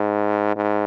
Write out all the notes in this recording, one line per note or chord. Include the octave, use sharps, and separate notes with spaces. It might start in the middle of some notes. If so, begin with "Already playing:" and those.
Already playing: G#2
G#2